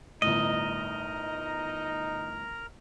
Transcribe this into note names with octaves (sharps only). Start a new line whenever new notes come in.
G1 A2 D#4 A#4 D#5 A#5